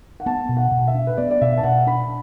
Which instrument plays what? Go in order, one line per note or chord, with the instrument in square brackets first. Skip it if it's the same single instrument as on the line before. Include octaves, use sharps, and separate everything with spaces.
[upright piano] F#5
[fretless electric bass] B3 [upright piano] A5
[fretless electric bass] B2
[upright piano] F#5
[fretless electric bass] B2
[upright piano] E5
[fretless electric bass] D4
[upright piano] B4
[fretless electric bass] B3 [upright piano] D5
[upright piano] D5
[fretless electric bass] B2 [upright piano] E5
[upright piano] A5
[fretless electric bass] B2 [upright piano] F#5
[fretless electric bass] D4 [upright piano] B5